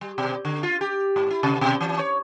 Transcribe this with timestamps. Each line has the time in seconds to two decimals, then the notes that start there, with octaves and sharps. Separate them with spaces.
0.01 G3
0.18 B2
0.45 D3
0.63 F4
0.81 G4
1.16 G#2
1.30 E4
1.43 C3
1.61 B2
1.81 E3
1.99 C#5